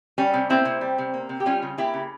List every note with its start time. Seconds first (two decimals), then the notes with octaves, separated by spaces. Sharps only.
0.18 G3 C#4
0.33 C3
0.49 A#3 C4 E4
0.65 C3
0.81 G3
0.98 C3
1.14 A#3
1.29 C3
1.40 G4
1.46 G3 C#4 F4
1.62 C#3
1.78 A#3 E4 G4
1.94 C#3